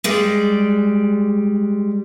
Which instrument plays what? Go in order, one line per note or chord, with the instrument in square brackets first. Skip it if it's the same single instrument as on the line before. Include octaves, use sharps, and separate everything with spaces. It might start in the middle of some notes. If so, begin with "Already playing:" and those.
[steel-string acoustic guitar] G3 G#3 D5